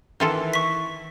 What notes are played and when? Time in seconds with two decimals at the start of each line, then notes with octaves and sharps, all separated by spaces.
0.20 D#3 E3 F4 A4
0.54 C#6 B6